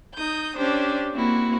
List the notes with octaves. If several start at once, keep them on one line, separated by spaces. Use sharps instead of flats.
D#4 D#6 G6
C#4 D4 G4 C5
A#3 C4 E4 F#4